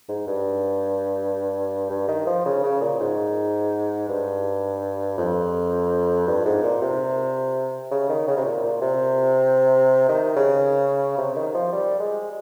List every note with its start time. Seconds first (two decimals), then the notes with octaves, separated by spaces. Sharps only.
0.09 G#2
0.27 G2
1.90 G2
2.08 D#3
2.27 F3
2.45 C#3
2.64 C#3
2.81 A#2
3.00 G#2
4.09 G2
5.18 F2
6.27 G2
6.45 G#2
6.63 A#2
6.82 C3
7.91 C#3
8.09 D#3
8.28 C#3
8.37 C3
8.45 A#2
8.63 A#2
8.82 C3
10.09 D#3
10.36 C#3
11.18 C3
11.36 D#3
11.54 F3
11.73 G3
12.00 G#3